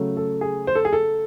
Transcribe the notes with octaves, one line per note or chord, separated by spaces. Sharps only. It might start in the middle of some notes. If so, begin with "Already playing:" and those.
Already playing: C#3 F#3 A3
A4
G#4
C5
A4
G#4
A4